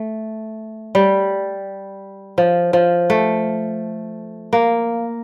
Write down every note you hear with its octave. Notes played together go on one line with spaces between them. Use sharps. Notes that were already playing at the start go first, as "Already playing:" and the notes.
Already playing: A3
G3
F3
F3
A3
A#3